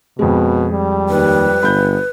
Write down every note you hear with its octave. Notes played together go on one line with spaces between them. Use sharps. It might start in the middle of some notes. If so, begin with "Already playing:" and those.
F2 B2 G#3
G3
D#2 B4
G1 B5 G6